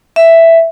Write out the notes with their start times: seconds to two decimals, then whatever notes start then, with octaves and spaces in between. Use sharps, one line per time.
0.16 E5